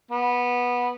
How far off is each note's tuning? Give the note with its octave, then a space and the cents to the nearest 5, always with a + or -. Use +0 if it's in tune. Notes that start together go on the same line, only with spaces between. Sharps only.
B3 -15